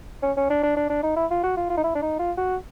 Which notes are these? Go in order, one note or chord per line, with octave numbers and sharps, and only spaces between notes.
C#4
C#4
D4
D4
D4
D4
D#4
E4
F4
F#4
F4
F4
D#4
E4
D4
D#4
F4
F#4